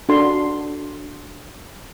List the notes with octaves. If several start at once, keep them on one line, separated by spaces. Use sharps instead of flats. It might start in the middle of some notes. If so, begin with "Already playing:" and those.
D4 F#4 A4 C6